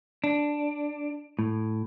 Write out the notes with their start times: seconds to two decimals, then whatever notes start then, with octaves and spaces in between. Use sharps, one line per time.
0.24 D4
1.39 A2